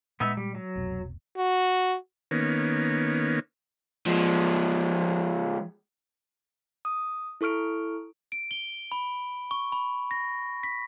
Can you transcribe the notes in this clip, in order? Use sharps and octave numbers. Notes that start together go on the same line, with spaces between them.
A#2 G#3 B3 D#4 E5
G3
F#3
F1 C2 B2
F#4
D#3 A#3 B3 C#4
F3 G#3
D#6
E4 A4 C#6 F6 D7
D7
G7
B5
C#6
B5
A#6
B6